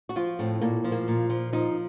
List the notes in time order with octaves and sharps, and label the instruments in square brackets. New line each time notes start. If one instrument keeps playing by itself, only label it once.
[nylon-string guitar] F#4
F3 F4
A2 C4
A#2 A#3
F3
A#3
A#2
F3
F3 D#4